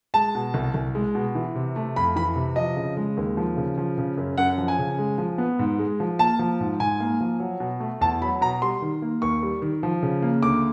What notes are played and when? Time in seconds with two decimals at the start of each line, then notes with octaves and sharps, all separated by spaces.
0.14 G#3 A5
0.35 B2
0.54 C2
0.74 C2
0.95 G#3
1.15 B2
1.35 E3
1.55 C3
1.76 A3
1.96 F2 B5
2.16 E3 B5
2.36 C3
2.56 F3 D#5
2.76 C#3
2.97 G#3
3.17 D#2
3.37 F3
3.57 C#3
3.78 F3
3.98 C#3
4.17 F#2
4.38 F#2 F#5
4.58 F3
4.68 G#5
4.79 C#3
4.98 G#3
5.18 F3
5.38 B3
5.59 G#2
5.79 G#3
6.00 F3
6.19 A#3 A5
6.39 F3
6.60 G#2
6.80 G#2 G#5
7.00 A#3
7.20 F3
7.40 F#3
7.60 B2
7.80 A3
8.01 E2 A5
8.22 F#3 B5
8.41 B2 A#5
8.62 G3 C6
8.82 D#3
9.02 A#3
9.22 D#2 C#6
9.43 G3
9.62 D#3
9.83 F3
10.03 C#3
10.22 A#3
10.43 D2 D6